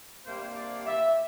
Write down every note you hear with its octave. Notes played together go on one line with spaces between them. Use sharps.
C3 G3 A#3 D4 C5
D5
E5